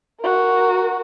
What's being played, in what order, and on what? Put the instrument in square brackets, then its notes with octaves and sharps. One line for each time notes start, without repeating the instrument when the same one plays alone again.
[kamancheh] F#4 A#4